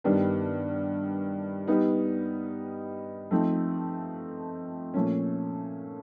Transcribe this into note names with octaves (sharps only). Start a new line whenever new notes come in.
G2 D#3 G3 B3 D4
G3 B3 D#4
F3 A3 C4 D#4
A#2 F3 A3 C#4